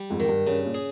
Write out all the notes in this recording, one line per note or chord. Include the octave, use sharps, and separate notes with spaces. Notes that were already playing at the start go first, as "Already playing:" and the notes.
Already playing: G3
F2 G#2
D#3
G2
G2 C#3
A#2
G#4